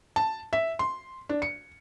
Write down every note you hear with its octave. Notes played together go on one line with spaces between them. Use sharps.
A5
E5
C6
D4
C#7